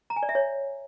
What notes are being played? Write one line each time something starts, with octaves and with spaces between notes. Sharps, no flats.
A#5
G#5
D5
E5
C#5